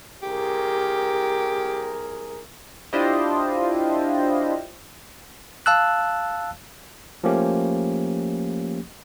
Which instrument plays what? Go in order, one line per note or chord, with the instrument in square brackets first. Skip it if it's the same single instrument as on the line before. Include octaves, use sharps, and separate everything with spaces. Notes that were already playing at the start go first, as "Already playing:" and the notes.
[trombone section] C2 G#4 A#4 [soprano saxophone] G4
[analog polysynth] D4 E4 F4 G4 C5 D#5
[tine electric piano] F5 A5 E6 F#6
F3 A3 A#3 C#4 G4